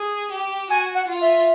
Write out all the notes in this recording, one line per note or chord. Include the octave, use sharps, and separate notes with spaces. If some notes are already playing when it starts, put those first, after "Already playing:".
Already playing: G#4
G4
F#4 G#5
F#5
F4
E5